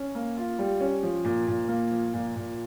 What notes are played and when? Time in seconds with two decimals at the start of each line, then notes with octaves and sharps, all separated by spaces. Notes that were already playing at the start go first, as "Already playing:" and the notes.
Already playing: C#4
0.15 A#3
0.37 F4
0.59 G3
0.81 C#4
1.03 F3
1.25 A#2
1.47 A#2
1.68 A#3
1.91 F3
2.13 A#2
2.36 A#2